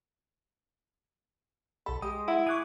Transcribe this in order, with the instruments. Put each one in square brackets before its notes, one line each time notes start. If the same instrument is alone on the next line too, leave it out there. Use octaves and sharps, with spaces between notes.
[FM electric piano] B1 B5 [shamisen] A4
[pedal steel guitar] G#3 [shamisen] G4 [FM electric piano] D#6
[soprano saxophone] E4 [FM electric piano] E5 [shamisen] F#5
[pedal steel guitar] G#4 D6 [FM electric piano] C#6 F#6 G#6